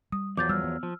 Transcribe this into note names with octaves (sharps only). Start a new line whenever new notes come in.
G3 D#6
E2 F3 F#3 D6 G6 A6
G3 E6 F6
B3
F3